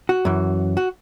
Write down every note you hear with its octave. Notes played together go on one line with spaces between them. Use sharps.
F#4
F#2 E3
F#4